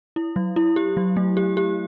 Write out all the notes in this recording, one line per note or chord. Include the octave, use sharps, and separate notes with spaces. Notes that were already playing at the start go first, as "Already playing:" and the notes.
E4
F#3
E4
G4
F#3
A3
G4
G4